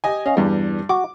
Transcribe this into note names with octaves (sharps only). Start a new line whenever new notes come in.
G4 D#5 G#5
C#4 D#5 F5
E2 G2 G3
F#4 D6